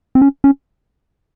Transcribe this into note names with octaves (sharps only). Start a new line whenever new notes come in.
C4
C#4
C#4